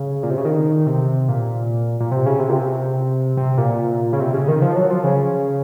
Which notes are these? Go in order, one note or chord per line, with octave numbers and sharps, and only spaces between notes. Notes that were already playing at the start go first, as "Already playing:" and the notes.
Already playing: C#3
A#2
C3
C#3
D#3
C3
A#2
A#2
C3
C#3
C3
A#2
C3
C3
A#2
C#3
C3
C#3
D#3
F3
F#3
F3
C#3